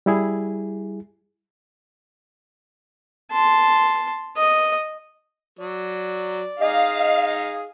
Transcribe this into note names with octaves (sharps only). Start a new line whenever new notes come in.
G3 E4 G#4
A5 C6
D#5
F#3 D5
D#4 G#4 D#5 F5